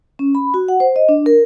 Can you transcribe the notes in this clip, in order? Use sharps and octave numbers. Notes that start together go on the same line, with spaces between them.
C#4
B5
F#4
F#5
C5
D#5
D4
A#4